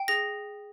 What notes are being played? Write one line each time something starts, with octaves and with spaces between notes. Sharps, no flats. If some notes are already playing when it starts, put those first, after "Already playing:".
Already playing: G5
G#4 A#6